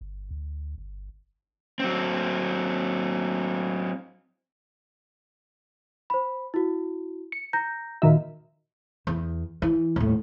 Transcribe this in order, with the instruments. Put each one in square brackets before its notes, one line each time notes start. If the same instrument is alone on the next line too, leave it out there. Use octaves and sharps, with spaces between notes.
[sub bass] G1
D2
G1
[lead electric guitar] F#3 C4
[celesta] C5 B5
E4 F#4
[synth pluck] C#7
[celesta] A#5 G6 A#6
[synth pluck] A#2 D#3 E5 [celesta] F#4
[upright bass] E2
E3
D#1 A2